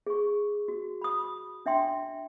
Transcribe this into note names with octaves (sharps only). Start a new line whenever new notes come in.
G#4 C#6
F#4
B5 D#6
D4 E5 G5 C6